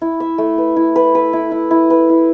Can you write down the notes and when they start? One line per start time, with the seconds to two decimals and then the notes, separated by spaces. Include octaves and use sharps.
0.01 E4
0.20 E5
0.38 A3
0.58 B4
0.76 E4
0.96 B4
1.15 B4
1.33 E4
1.52 E4
1.71 E4
1.90 B4
2.09 E4